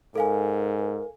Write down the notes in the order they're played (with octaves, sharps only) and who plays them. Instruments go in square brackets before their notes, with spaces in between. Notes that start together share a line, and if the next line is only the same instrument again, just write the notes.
[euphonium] G#2 [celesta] A4 F5 G#5 [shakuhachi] A#4